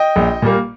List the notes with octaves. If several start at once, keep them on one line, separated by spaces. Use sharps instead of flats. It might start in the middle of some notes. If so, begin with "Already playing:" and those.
Already playing: D#5 G5
A#1
A#2 G3 A#3